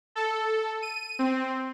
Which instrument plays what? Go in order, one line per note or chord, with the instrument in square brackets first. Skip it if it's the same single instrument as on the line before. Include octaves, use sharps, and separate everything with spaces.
[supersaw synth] A4
D#7
C4